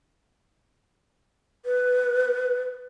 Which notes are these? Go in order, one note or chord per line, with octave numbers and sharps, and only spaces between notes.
B4